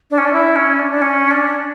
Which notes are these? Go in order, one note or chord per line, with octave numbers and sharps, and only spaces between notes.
D4
C#4
D4
E4
C#4
D4
D4
C#4
D4